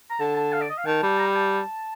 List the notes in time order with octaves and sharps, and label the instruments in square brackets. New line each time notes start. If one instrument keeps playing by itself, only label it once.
[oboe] A#5
[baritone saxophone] D3 [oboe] A5
[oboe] A5
F5
D5
D#5
F5
[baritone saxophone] D#3 [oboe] A5
[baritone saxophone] G3
[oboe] A#5
G5
A5